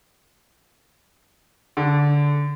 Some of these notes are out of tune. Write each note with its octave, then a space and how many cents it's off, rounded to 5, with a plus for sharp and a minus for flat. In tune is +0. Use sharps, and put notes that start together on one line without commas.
D3 -15